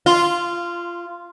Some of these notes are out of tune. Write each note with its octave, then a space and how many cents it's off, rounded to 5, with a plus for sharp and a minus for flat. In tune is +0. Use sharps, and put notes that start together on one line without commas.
F4 -15